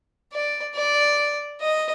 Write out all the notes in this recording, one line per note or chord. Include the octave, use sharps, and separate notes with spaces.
D5
D5
D#5